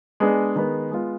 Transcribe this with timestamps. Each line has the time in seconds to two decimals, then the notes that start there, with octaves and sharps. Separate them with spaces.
0.20 G#3 B3 D4 G#4
0.56 D#3 G#3 B3
0.91 G#3 B3 F4